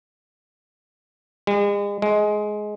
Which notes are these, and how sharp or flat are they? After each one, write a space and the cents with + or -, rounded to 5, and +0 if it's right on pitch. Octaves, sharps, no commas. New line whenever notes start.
G#3 -40
G#3 +15